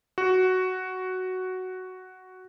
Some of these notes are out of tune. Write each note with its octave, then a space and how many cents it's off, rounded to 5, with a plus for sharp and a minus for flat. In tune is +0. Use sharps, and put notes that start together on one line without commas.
F#4 +5